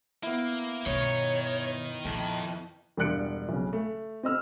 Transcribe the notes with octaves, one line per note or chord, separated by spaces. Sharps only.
A#3 B3 E4
G2 B2 D#3 D#4 C#5
F2 A#2 G5
E1 G2 D4 F#6 C#7 D7
B1 C#3
A3
C4 D#5 E6 F6